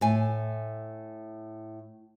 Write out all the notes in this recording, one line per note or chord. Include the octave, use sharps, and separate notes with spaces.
A2 G#5